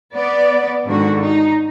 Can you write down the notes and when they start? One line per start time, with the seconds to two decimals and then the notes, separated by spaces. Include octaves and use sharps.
0.14 B3 D5
0.86 G#2 D3 D#3 F#4
1.21 D#4